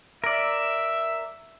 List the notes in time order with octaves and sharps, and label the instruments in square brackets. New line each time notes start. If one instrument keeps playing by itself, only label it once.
[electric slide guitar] A#4 D5 [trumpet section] E5